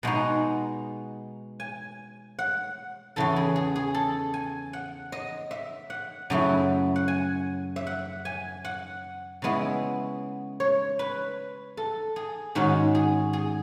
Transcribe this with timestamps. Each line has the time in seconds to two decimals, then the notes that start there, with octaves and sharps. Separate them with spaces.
0.03 B2 G#3 D#4 F#5
1.60 G#5
2.39 F#5
3.16 E2 C#3 E3 A4
3.36 G#4
3.56 G#4
3.76 G#4
3.94 A4
4.34 G#5
4.73 F#5
5.12 D#5
5.51 E5
5.90 F#5
6.30 F#2 C#3 F#3 A3 E4
6.96 F#5
7.08 G#5
7.76 E5
7.87 F#5
8.25 G#5
8.65 F#5
9.42 C#3 G#3 B3 E4
10.60 C#5
10.99 B4
11.77 A4
12.16 G#4
12.55 G#2 D#3 G#3 C#4 F#4
12.95 G#4
13.33 G#4